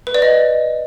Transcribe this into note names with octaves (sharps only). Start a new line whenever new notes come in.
B4
D5
D#5